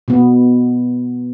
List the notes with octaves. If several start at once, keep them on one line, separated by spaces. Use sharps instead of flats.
B2 B3